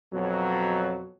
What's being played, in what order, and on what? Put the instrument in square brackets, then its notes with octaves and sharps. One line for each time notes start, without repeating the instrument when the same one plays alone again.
[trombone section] F2 B2 F#3